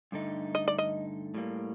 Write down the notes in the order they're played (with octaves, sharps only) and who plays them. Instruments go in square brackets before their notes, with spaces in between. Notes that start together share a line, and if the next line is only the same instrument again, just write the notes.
[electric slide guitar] G2 D3 A3 D#4
[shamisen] D#5
D5
D#5
[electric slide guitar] A2 G3 A#3